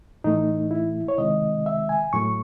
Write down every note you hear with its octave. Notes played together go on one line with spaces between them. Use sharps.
A2 E3 A3 D#4
E4
C#5
C3 D#3 G#3 D#5
E5
G#5
A2 F#3 A3 C#6